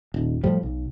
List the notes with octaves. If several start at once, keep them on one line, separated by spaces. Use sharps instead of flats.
D#1
A2 F3 G3
B1